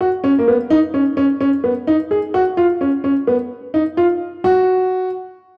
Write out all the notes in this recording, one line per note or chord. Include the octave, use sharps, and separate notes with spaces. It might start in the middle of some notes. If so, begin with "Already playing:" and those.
F#4
C#4
A#3
B3
D#4
C#4
C#4
C#4
B3
D#4
G#4
F#4
F4
C#4
C#4
B3
D#4
F4
F#4